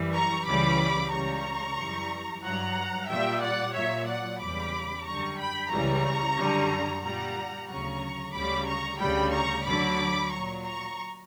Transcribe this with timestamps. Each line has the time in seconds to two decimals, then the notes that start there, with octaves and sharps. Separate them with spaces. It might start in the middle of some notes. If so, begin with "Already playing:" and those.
Already playing: F#2 E3 G3
0.13 A#5 C#6
0.46 C#2 C#3 E3 G3 B5 D6
1.12 C#2 C#3 G3 A#5 C#6
1.78 F#2 E3 G3
2.43 G2 F#3 F#5 A#5
3.09 A#2 G3 E5 G5
3.42 D5 F#5
3.75 A#2 F#3 C#5 E5
4.08 D5 F#5
4.40 E2 C#3 G3 B5 D6
5.06 F#2 D3 G3 A#5 C#6
5.40 G5 B5
5.72 C#2 C#3 E3 G3 A#5 C#6
6.37 F#2 D3 G3
7.03 A#2 G3 F#5 A#5
7.68 D2 C#3 F#3 A#5 C#6
8.34 D2 C#3 G3 B5 D6
8.67 A#5 C#6
9.00 D2 C#3 G3 G5 B5
9.33 A#5 C#6
9.65 D2 D3 F#3 B5 D6
10.31 A#2 F#3 A#5 C#6
10.64 A#5 C#6